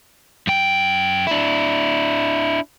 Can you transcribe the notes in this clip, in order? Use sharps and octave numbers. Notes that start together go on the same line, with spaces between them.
F#2 G5
D4 E4